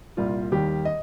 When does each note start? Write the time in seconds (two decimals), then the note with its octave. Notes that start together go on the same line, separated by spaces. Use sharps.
0.17 C2 A#2 G3 F4
0.52 D#2 D#3 G3 G4
0.85 D#5